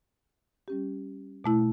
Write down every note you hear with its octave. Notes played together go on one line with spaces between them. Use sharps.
G3 C#4 G4
B2 A3 E4